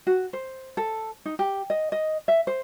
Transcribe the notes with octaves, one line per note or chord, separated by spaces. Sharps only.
F#4
C5
A4
D#4
G4
D#5
D#5
E5
C5